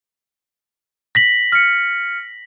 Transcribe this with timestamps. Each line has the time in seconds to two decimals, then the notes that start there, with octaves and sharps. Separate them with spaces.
1.15 A#6 B6 F#7
1.52 F6 C#7